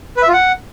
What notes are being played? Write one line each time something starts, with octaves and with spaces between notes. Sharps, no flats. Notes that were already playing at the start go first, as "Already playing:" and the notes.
B4
E5
F4
F#5